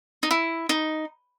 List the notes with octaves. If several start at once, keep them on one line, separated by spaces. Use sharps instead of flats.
D#4
E4
D#4